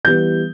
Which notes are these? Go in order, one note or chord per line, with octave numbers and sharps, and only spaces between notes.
E3 G3 B3 G6